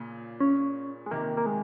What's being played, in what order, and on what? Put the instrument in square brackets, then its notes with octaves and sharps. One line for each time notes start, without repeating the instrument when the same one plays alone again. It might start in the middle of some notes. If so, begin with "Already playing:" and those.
Already playing: [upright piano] A#2 C#3
[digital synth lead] C#4
G#3
[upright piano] C3 D#3 [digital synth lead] A#3
[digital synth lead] A#3
G#3